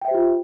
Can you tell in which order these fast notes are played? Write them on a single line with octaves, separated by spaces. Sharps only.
G5 E5 C5 G4 F4